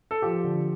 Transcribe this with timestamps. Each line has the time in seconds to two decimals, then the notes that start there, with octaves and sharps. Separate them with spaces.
0.11 A4
0.22 F3 G4
0.44 D3